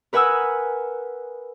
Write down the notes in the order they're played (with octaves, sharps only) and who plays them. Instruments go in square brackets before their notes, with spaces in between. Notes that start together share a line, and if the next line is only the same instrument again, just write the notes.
[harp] A#4 B4 F#5 G#5 D#6 E6